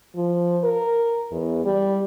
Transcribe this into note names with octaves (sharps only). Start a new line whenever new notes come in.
F3
A#4
E2
G3